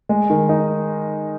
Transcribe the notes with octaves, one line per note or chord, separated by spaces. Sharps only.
G#3
D#3
D#4